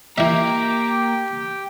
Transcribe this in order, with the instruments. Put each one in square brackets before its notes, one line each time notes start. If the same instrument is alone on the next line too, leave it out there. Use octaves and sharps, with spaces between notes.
[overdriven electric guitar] A#3 [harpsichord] E4 E5 [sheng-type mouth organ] G4 G5 [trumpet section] A#5 D6